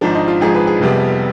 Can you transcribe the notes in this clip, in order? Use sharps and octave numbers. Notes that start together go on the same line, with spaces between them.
G#1 G#2 F3 D4
D#4
F4
G#1 G#2 F3 G#4
B4
G#4
F1 F2 C3 G3 B3